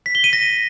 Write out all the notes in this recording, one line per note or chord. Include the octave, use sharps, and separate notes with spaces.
B6
G7
D#7
A#6